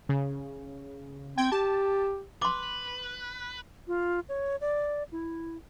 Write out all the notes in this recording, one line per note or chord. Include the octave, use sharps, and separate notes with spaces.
C#3
C4 G5 G#6
G4 A5
B4 C6 D6
F4
C#5
D5
E4